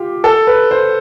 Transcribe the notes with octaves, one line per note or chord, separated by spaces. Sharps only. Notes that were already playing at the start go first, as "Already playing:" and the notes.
Already playing: F4 G4
A4
B4
C5